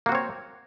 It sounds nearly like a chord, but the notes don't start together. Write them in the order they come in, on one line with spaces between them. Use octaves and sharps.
A#3 F#4 C4 C#5